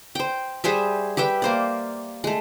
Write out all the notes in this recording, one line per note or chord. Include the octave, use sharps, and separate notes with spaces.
C5 G5
G3 G#4 C5 E5
G4 B4 E5 G5
A#3 C5 D5
G#3 A3